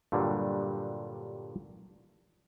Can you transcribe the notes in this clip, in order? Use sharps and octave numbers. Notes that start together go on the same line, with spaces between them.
G2 A#2 D3 F#3 G3 D4